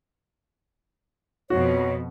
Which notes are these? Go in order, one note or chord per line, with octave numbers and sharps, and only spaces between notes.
F2 B2 F#4 C#5